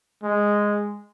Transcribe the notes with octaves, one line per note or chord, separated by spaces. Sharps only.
G#3